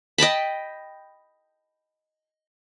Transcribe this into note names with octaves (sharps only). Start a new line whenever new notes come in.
D#5 G5 A5 B5